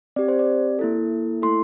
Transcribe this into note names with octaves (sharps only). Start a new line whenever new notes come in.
C4 G4 D5
C5
D5
A#3 E4 A4
A3 E4 A4 C6